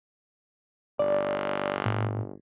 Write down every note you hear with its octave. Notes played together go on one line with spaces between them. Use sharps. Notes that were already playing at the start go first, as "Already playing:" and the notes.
G1 D5
A2